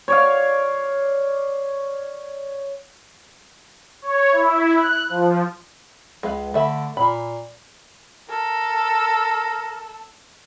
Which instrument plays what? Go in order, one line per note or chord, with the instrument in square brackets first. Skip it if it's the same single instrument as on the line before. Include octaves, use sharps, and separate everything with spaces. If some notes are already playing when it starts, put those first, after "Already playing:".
[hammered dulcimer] C#5 D5 F5
[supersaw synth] C#5
E4
F#6
F3
[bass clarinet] C#2 [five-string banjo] G#3 B4 F5
[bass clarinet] D3 [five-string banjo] A3 E5 B5
[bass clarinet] A#2 [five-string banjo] B5
[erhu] A4 [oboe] A#4